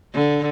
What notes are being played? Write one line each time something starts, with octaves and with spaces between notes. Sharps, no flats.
D3